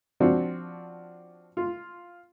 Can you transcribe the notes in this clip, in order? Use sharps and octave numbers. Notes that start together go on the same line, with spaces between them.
F3 C4 D4 F#4
F4